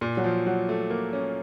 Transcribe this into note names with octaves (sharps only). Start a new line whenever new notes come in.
A#2
F#3
F3
F#3
A3
A#3
C#4